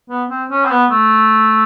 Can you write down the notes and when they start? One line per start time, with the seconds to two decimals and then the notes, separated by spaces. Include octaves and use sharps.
0.09 B3
0.30 C4
0.50 C#4
0.65 C4
0.70 B3
0.91 A3